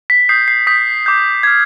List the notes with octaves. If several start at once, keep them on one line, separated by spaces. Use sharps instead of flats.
B6
D#6 G6 C7
C7
D#6 G6 B6
D6 G6
D6 F6 G#6